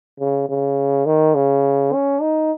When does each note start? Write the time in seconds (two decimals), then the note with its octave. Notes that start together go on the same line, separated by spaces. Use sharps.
0.20 C#3
0.49 C#3
1.06 D#3
1.35 C#3
1.93 C#4
2.22 D#4